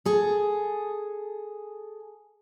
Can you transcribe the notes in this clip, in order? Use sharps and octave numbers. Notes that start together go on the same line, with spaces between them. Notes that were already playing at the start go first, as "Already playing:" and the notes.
G#4 A4